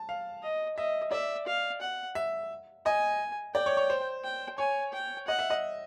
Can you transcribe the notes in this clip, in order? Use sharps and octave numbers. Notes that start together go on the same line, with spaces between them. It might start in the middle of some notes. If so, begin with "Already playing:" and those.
Already playing: A5
F5
D#5
D#5 E5
D5 E5
F5
F#5
E5
D#5 G#5
D5 G5
C#5
C#5
C5
G5
C#5 G#5
G5
D#5 F#5
E5
D#5